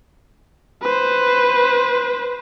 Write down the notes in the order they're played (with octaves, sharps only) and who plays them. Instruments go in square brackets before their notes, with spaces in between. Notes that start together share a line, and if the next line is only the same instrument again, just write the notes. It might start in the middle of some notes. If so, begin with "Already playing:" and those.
[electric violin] B4 C5